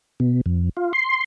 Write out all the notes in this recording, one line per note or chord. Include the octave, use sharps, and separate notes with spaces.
B2
F2
F4
C6